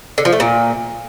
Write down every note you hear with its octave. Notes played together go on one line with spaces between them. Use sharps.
D3
F3
A3
A#2